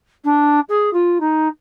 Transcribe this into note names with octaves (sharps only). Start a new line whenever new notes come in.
D4
G#4
F4
D#4